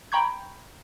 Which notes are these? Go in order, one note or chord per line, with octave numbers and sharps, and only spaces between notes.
G5 A#5 B5 C#6 G6 G#6